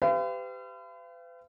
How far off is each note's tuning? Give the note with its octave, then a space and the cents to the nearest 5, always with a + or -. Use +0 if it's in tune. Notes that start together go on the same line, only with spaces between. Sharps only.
G4 +0 B4 +45 F5 -45